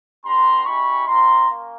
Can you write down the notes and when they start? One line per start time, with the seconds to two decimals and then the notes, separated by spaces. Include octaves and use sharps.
0.24 B3 D4 G4 A#5 C6
0.65 G#3 C#4 E4 G4 B5 C#6
1.07 C4 F4 A#5 C6
1.48 A#3 C#4